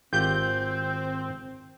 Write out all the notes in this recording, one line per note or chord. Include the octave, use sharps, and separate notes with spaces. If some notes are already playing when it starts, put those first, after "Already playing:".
G#1 C4 F4 G4 G6